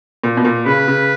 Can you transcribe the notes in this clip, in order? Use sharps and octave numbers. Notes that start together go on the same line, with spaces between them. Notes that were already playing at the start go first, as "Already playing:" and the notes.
A#2
B2
A#2
C#3 B4
C#3